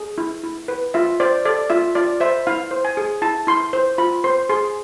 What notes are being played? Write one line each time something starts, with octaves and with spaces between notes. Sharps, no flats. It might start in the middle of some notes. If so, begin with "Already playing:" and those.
Already playing: G#4
E4
E4
B4
F4 E5
C5 D5
A4 D5
F4 E5
F4 D5
C5 E5
E4 F5
C5
G#5
G#4
E4 A5
E4 C6
C5
F4 B5
C5 C6
G#4 C6